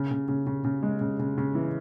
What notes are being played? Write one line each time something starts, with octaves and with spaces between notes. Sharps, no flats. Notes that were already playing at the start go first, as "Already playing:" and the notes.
Already playing: C#3
C#3
C#3
C#3
C#3
G#3
C#3
C#3
C#3
E3